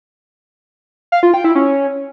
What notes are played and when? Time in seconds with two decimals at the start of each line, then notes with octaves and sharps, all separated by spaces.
1.12 F5
1.23 F4
1.34 G5
1.44 E4
1.55 C#4